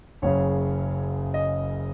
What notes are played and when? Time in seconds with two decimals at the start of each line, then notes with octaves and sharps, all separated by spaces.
0.22 F#1 F#2 C#3 C#5
1.34 D#5